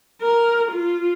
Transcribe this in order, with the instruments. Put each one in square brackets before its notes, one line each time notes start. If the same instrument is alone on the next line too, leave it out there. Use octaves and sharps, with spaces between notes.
[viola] A#4
F4